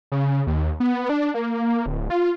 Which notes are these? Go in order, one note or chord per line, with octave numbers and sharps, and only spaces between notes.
C#3
D#2
B3
D4
A#3
D1
F4